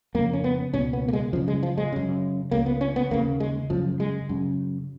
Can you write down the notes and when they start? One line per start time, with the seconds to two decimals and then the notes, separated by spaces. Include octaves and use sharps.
0.15 F2 C#3 A#3
0.33 C#4
0.44 B3
0.74 C#2 B2 C#4
0.93 B3
1.08 A#3
1.13 G#3
1.33 F#2 C#3 F3
1.48 G#3
1.63 F3
1.78 G#3
1.92 F#2 C#3
2.51 C#2 C#3 A#3
2.66 B3
2.81 C#4
2.96 B3
3.11 D#2 C#3 A#3
3.40 G#3
3.70 F#2 C#3 F3
4.00 G#3
4.29 F#2 C#3